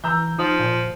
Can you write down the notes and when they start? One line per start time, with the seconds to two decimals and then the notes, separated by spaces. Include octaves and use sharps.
0.04 E3 A#5 E6 G6
0.38 F3 D#4 D#6
0.60 A#2